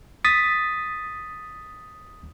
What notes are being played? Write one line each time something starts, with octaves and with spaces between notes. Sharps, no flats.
D#6 A6 B6